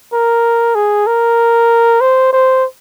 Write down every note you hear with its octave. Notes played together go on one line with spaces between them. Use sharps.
A#4
G#4
A#4
C5
C5